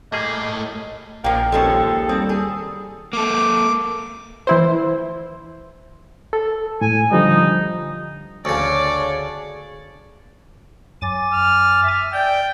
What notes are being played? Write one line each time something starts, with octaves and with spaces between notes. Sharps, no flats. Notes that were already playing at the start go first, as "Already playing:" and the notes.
A2 G3 A3 A#3 G#4 D#5
A#1 A#2 F3 A#3 G5
D#2 F3 G#3 C#4 A4
G3 C4 D#6
G#4
A#3 A4 D6
E3 E4 C5
A4
A2 G#5
D3 F3 G3 D#4
D2 C#3 D4 C#5 D5
F#2 G#5 D6 A6
F6
E5
D5 G5 G6 A6